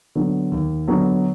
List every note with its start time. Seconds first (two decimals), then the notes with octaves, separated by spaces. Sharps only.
0.15 D3 F#3 B3
0.52 D#2
0.88 D3 F#3 B3